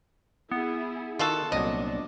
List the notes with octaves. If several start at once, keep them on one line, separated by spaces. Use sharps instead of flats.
B3 E4 G#4
D#3 F4 F#4 A4
C2 A#2 F#3 D4 D#5